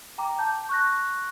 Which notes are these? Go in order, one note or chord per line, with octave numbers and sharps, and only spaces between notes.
G5 A#5 D6
A5 G6
C#6 F#6 A#6